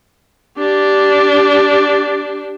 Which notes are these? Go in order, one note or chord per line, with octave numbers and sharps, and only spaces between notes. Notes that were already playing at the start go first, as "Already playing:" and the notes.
D4 G4